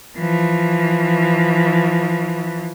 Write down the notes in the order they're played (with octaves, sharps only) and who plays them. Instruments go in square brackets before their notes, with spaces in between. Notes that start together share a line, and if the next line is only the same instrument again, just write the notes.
[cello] E3 F3